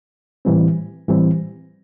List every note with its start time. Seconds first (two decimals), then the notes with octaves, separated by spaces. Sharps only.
0.45 A2 E3 G3 C4
1.08 A2 E3 G3 C4